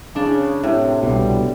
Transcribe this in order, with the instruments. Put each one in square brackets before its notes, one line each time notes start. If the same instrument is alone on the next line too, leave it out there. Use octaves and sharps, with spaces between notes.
[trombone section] C#3 [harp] D4
[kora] A2 [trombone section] C3
[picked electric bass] C2 B2 [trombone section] D3 G3